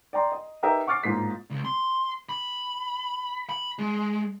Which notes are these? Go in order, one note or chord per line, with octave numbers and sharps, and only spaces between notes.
D5 G5 A#5 C6
D#5
D#4 G4 A#4 B4 D#5 E5
F#5 C#6 D6 F6 A6 C7
A1 G#2 A#3 F4 B6 C7
C#2
C6
B5
B5
G#3